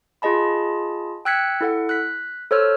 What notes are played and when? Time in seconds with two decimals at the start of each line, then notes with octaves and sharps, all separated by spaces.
0.22 F4 G#4 D#5 A5 B5
1.25 G5 E6 F#6 G#6 B6 C#7
1.61 E4 A4 F#5
1.89 F#6 B6
2.51 A4 C5 C#5 E6 F6